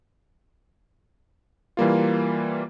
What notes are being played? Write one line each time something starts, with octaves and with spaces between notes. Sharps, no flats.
E3 G3 A#3 F4